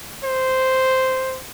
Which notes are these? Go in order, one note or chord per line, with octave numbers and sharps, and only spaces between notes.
C5